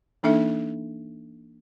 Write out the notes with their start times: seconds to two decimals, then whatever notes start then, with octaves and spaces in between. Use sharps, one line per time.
0.23 E3 A#3 D4 D#4 A4 E5